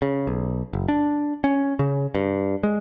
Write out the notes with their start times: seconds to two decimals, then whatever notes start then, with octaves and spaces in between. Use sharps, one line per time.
0.02 C#3
0.27 B1
0.73 F#1
0.88 D4
1.44 C#4
1.79 C#3
2.15 G2
2.63 G#3